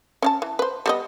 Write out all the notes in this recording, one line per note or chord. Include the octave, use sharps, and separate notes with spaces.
C#4 F5 A5
E3
B4 C5
G3 B3 D#5